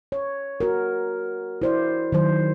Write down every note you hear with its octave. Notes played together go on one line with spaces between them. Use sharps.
C#5
F#4 A#4
E4 C5 D5
D#3 F#3 C5